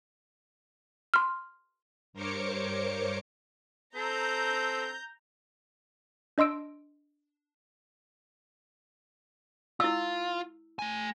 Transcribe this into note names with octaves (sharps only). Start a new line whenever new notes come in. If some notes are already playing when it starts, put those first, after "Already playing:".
C6 F6
G2 A#4 C5 C#5 D6 C#7
C4 A4 A#5 G6
D4 D#5 C6 E6 D7
E4 F4 E6
A3 G#5